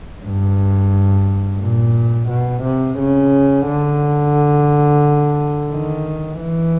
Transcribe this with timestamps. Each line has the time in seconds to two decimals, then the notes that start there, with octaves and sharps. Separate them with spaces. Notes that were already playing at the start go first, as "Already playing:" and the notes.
0.25 G2
1.60 A#2
2.29 B2
2.63 C3
2.98 C#3
3.66 D3
5.71 D#3
6.39 E3